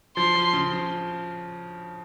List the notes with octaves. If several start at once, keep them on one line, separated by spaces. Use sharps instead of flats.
F3 C6
F3
C#3
F3